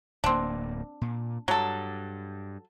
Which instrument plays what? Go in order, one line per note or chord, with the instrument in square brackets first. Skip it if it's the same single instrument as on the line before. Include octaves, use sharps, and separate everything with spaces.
[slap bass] D1 A#3 [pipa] C4 D4
[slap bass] A#2
[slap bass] G2 [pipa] F#3 A4